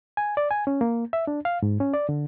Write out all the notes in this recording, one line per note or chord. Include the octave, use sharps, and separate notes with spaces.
G#5
D5
G#5
C#4
A#3
E5
D4
F5
G#2
C#4
D5
D3